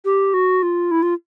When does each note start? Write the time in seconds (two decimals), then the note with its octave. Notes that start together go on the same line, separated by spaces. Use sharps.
0.05 G4
0.34 F#4
0.63 F4
0.91 E4
1.02 F4